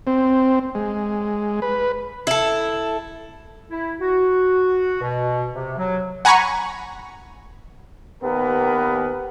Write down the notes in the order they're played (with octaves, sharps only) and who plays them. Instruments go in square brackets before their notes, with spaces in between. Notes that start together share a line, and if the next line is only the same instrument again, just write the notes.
[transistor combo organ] C4
G#3
B4
[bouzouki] E4 A4
[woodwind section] E4
F#4
B2
C3
F#3
[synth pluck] F#5 G#5 A#5 B5 C#6
[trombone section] D#2 B3 G4 A#4 B4